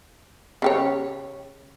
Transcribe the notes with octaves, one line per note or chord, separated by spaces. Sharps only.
C#3 G4 C#5